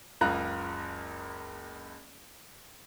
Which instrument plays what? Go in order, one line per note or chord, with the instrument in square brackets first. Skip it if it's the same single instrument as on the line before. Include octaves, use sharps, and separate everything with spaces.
[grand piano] F#1 C#2 F4 A#5 F#6